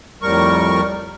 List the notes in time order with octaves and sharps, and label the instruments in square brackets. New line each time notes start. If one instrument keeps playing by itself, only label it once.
[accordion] F2 A2 G3 A#4 C#6